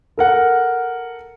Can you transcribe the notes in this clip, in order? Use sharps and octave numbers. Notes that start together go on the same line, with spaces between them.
A4 A#4 F#5